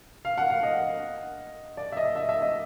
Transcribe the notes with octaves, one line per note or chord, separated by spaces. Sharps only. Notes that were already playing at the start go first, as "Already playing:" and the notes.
F5
F#5
F5
D#5
D5
E5
D#5
E5
E5
D#5